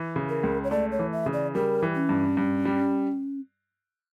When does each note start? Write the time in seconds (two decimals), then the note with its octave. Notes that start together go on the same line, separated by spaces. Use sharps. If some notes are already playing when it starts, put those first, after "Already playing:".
Already playing: E3
0.16 C#3
0.29 A#4
0.43 C#2
0.64 C#5
0.71 A3 D5
0.92 C#5
0.99 E3
1.12 E5
1.26 C#3
1.33 D5
1.55 G3 A#4
1.82 E3
1.95 C#4
2.09 G2
2.37 G2
2.65 G3